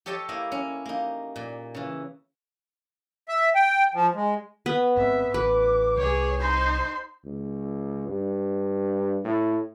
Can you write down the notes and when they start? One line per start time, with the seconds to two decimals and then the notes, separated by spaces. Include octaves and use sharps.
0.06 G4 A4 C#5 D#5 G5 A5
0.29 A#3 E4 D#5 F5
0.52 C#4
0.86 A#3 D#4
1.36 A#2
1.75 C#3 E3
3.29 E5
3.55 G5
3.94 F3
4.14 G#3
4.66 B3 B4
4.97 G#2 C4 E5
5.34 A1 B4 D6
5.97 C2 G#4 C#5
6.41 D#4 C5 C6
7.25 C#2
8.08 G2
9.24 A2